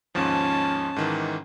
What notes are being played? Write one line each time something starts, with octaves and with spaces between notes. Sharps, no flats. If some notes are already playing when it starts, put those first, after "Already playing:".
D#2 G#2 F3 C#4 A5
G#2 D#3 E3